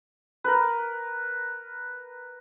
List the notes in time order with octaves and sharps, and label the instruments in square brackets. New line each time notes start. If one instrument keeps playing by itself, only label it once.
[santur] A#4 B4